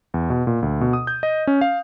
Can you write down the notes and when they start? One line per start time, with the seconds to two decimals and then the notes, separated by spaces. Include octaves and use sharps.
0.14 E2
0.30 B2
0.47 A#2
0.62 D2
0.81 B2
0.93 D#6
1.07 G6
1.23 D#5
1.47 C#4
1.61 F5